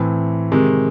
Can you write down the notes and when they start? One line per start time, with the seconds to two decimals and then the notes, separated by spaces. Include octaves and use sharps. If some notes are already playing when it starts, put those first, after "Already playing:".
Already playing: A2 E3 C4
0.52 C3 D#3 G#3